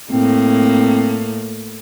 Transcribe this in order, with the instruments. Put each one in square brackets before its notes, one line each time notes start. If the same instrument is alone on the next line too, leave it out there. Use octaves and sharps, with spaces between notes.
[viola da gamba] A2 A#3 [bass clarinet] C4